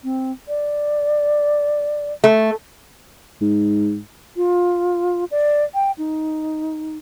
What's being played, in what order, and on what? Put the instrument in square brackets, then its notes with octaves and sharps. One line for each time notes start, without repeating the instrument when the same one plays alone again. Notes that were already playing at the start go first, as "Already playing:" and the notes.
[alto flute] C4
D5
[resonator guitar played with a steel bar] A3
[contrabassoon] G#2
[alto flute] F4
D5
G5
D#4